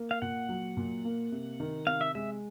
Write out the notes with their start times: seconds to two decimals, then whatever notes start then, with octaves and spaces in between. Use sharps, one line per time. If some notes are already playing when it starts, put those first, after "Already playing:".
Already playing: A#3
0.11 F5
0.22 A#2 F#5
0.49 F#3
0.77 A#2
1.05 A#3
1.32 C3
1.60 D#3
1.87 C3 F5
2.01 E5
2.15 G#3 E5